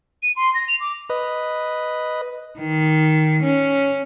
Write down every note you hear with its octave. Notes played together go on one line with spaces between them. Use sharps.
D#7
C6
A#6
F7
D6
B4 D#5
D#3
C#4